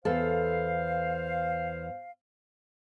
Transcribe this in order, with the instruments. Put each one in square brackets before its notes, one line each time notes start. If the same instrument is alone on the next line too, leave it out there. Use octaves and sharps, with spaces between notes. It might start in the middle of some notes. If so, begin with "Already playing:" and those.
[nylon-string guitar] E2 A4 [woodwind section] C5 F5